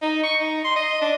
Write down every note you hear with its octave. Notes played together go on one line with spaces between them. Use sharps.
D#4
C#6
D#4
C6
D#5
D4